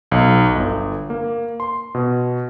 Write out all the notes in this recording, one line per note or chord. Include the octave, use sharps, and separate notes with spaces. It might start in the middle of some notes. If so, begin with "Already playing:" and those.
B1
G1
A#3
C6
B2